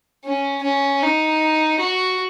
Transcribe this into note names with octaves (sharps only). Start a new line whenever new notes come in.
C#4
C#4
D#4
F#4